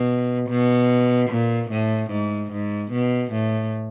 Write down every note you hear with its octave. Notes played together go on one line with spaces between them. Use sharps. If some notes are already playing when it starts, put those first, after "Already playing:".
Already playing: B2
B2
A#2
A2
G#2
G#2
B2
A2